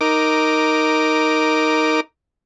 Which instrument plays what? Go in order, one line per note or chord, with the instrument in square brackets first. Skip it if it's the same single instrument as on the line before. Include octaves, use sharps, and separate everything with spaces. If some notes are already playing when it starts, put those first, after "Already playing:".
[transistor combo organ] D#4 A#4 D6